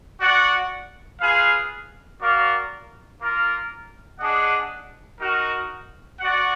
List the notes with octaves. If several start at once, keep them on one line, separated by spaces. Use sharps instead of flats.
F#4 D5 F#5
F4 G#4 B4 F5
F#4 A#4 D5 F5
A#3 F4 A#4
D4 G#4 D#5 F#5
D#4 F#4 A#4
F#4 D5 F#5